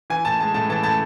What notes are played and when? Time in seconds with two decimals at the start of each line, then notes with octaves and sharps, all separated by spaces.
0.10 E3 G#5
0.25 A2 A5
0.40 G#3 A5
0.54 A2 A5
0.69 E3 A5
0.83 A2 A5